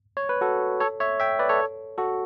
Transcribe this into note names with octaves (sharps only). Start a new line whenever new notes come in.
C#5
B4
F#4 A4
A4 C#5
C#5 E5
E5 G5
B4 D5
A4 C#5
F#4 A4